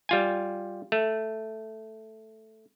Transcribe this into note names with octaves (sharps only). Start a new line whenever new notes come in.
G3 F4 G#5
A3